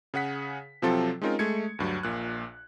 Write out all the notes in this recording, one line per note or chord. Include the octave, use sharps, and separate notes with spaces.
C#3 G#4 F#5 B6
C3 F3 F#3 C4 F4 A4
G#3 C4 C#4 D#4 F4 A#4
G#3 A3 G#6 C#7
D2 G2 F#3
A#1 A#2 F#6